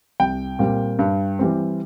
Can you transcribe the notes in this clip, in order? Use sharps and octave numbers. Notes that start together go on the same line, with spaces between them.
C2 G5
A#2 G3 C4
G2
E3 G3 C4